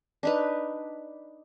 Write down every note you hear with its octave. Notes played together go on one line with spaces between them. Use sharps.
D4 D#4 B4